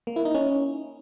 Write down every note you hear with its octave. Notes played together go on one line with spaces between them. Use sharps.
A#3
E4
D#4
C#4